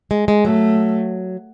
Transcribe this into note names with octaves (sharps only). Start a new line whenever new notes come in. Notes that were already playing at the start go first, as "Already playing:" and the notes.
G#3
G#3
F#3 A3